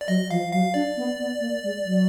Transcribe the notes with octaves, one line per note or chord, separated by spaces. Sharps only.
D5
F#3 D#5
F3 F5
F#3 F5
D4 D5
B3
B3
A#3
G#3
F#3